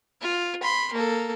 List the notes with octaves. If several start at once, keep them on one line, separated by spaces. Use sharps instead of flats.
F4
B5 C6
A#3 A4